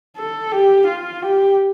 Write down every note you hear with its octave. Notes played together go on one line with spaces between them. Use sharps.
A4
G4
F4
G4